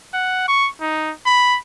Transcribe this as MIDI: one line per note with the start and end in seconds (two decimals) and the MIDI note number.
0.13 0.47 78
0.48 0.69 85
0.81 1.12 63
1.26 1.58 83